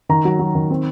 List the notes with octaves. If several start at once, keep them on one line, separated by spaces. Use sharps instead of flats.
D#3 A#5
F#3
F#3
D#3
C4